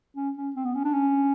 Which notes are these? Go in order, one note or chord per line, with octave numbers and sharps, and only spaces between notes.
C#4
C#4
C4
B3
C#4
D4
C#4